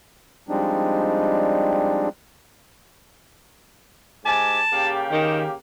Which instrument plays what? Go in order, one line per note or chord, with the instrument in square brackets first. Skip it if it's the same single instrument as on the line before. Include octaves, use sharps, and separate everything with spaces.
[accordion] F3 G3 G#3 C4 D4 D#4
[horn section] G#2 G4 G#5 [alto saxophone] A5
[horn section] C#3 A#3 G4
[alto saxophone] D#3